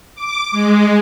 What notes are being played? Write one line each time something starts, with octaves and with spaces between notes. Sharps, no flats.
D6
G#3